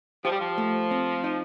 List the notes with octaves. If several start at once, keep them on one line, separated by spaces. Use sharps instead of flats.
F3 G4
G3
F3
A3
C4
D#4